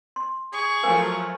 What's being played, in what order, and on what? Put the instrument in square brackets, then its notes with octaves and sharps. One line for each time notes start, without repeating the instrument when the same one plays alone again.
[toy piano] C6
[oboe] G#4 [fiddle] C#6
[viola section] F3 F#3 A3 [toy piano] A#4 F5 G#5